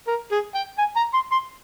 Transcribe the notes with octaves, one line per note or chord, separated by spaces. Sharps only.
A#4
G#4
G5
G#5
A#5
C6
C6